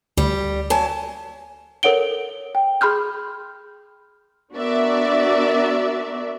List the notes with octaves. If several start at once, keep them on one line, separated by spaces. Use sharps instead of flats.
D2 G3
F#3 G#5 A5
A4 A#4 C#5 F#5 D7 G7
G5
G#4 B5 C6 F6 G6
B3 D4 F#4 A#4 D5 E5